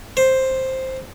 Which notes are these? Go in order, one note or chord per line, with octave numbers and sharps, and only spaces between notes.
C5